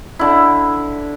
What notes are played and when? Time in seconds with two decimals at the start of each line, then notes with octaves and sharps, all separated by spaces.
0.19 D3 E4